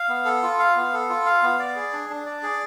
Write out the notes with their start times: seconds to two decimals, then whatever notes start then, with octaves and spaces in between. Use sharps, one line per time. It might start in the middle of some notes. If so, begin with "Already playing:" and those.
Already playing: F5
0.09 B3
0.25 A4
0.43 F4
0.59 F5
0.76 B3
0.93 A4
1.09 F4
1.26 F5
1.43 B3
1.59 D5
1.76 G#4
1.93 D4
2.10 D4
2.26 D5
2.43 G#4